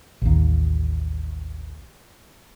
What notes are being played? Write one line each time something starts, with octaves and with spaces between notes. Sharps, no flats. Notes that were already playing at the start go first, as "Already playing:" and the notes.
A1 D#2